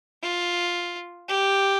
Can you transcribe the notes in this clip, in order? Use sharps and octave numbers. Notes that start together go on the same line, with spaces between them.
F4
G4